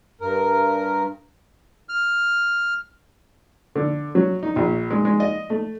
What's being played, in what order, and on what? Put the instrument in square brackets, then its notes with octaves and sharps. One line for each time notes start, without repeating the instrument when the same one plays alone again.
[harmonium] G2 A#4
[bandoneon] F6
[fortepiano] D3
F#3
D#4
A#1
G#3
G#3
D#5
A3